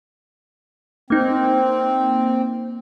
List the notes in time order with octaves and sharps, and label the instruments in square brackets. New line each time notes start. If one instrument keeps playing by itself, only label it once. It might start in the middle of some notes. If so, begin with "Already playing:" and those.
[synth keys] A#3 D#4 [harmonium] C4